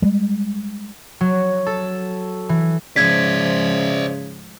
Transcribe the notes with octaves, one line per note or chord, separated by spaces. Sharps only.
G3 G#3
F#3
A4
E3
G#2 C#3 F3 C5 D5 G#6 B6